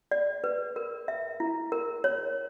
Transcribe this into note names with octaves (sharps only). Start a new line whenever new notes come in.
D5
B4
A#4
E5
E4
A#4
C#5